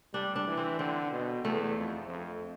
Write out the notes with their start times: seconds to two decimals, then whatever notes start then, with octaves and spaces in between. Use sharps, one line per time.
0.14 G3 D4
0.36 D4
0.47 E3
0.57 C4
0.79 D3 C4
1.12 B2
1.44 E2 A3
1.77 F2
2.09 F2